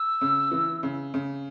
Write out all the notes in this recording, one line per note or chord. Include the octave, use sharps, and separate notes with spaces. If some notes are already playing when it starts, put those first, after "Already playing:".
Already playing: E6
C#3
E3
C#3
C#3